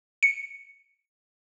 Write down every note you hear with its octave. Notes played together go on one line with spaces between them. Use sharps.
C#7